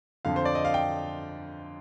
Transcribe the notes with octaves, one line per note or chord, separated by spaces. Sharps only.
F2 D3 F3 F5
C5
D5
D#5
F5
G5